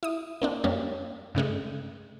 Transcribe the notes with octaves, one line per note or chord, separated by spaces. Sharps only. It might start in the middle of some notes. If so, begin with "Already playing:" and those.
E4 D#6
A#3 C4 D4
F#2 G3 A#3 C#4
G2 C#3 G#3 A3